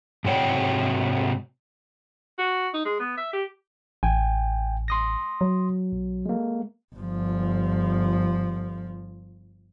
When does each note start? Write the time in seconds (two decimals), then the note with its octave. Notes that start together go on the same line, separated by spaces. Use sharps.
0.25 G#2 C3 F#4 C#5 G5
2.38 F#4
2.74 D#4
2.85 G#3
3.00 B3
3.18 E5
3.33 G4
4.03 A1 G5 G#5
4.88 C6 D#6 A#6
5.41 F#3
5.92 B1
6.26 G#3 A#3
6.95 G1 F3